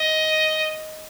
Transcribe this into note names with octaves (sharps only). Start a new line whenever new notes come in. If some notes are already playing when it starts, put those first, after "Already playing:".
Already playing: D#5